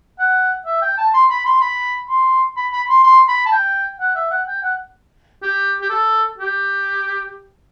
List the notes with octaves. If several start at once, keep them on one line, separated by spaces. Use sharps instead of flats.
F#5
E5
G5
A5
C6
B5
C6
B5
C6
B5
B5
C6
C6
B5
A5
G5
F#5
E5
F#5
G5
F#5
G4
G4
A4
G4